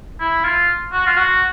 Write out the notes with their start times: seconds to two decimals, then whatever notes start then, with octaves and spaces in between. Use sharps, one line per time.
0.20 E4
0.44 F4
0.92 F#4
1.06 F4
1.17 F#4